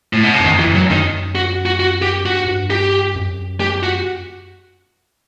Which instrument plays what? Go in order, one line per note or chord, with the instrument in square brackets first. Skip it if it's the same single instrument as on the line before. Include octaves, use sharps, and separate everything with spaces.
[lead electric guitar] A2
B2
C3
[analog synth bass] G2
[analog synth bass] F#2 [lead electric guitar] D#3
[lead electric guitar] E3
[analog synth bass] F#2
[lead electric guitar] F#3
[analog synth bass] F#2 [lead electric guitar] D#3
[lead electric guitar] F#4
F#4
F#4
G4
[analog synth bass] G2 [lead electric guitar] F#4
[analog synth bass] G2
[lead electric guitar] G4
[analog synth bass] F#2
[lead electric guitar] G4
F#4